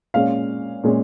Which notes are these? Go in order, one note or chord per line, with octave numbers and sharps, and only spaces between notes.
A#2 G#3 C#4 F5
A#2 G#3 C#4